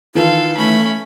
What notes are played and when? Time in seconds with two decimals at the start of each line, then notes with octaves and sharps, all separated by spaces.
0.15 D#3 E3 F4 A4 F5
0.57 A3 C#4 B5